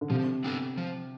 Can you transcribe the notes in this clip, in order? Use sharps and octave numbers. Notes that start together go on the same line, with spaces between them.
D3
C3 F3
B3 D4 A4
F3